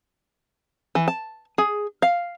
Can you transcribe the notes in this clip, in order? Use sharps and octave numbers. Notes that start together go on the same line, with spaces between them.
E3
A5
G#4
F5